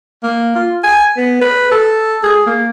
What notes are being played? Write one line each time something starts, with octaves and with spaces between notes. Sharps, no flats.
A#3
F4
G#5
B3
B4
A4
G#4
A#3